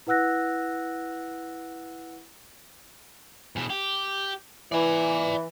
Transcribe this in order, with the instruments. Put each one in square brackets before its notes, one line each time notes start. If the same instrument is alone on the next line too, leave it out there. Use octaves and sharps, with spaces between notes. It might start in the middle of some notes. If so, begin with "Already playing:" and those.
[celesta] E4 B4 F#5 E6 F#6 A#6
[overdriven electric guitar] E2 B2
G4
[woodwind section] E3 [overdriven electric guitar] D5 G#5